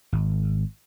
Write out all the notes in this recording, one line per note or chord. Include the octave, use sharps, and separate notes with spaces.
G#1